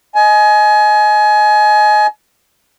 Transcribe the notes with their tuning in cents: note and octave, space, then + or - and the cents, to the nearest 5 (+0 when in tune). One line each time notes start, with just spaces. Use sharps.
D#5 +0 G#5 +30